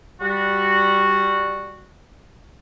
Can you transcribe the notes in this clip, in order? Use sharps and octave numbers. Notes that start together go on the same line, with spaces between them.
G3 F#4